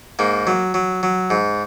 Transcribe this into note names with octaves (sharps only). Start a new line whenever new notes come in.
G#2 A#3
F#3
F#3
F#3
G#2